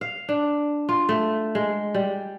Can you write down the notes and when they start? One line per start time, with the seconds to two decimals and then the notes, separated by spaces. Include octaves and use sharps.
0.01 F5
0.29 D4
0.89 F4
1.09 A3
1.55 G#3
1.95 G3